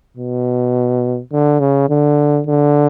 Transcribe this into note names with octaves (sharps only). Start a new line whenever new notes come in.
B2
D3
C#3
D3
D3